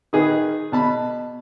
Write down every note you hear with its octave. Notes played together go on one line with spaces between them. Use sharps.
D#3 G#4 B4
B2 A5 B5